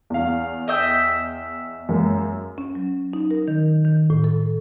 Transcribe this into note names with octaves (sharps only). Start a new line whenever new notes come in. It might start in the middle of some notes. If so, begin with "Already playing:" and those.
E2 F5
D#5 E5 G5
F#2 G#3 A#3
C#4
F#3
D#4
A#4
D#3
D#3
A2
A4